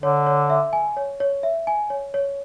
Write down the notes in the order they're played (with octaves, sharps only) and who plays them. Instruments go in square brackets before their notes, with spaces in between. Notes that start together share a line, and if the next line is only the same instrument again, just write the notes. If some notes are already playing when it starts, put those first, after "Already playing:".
[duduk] D3 [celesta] C#5
[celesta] C#5
E5
G#5
C#5
C#5
E5
G#5
C#5
C#5